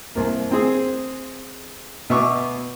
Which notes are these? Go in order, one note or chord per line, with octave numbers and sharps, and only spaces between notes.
C2 A#3
C4 G#4
B2 E5 C#6 D6